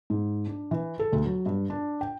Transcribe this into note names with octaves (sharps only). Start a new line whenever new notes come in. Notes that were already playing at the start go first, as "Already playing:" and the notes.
G#2
D4
E3
A4
D2
F#3
G2
D4
G5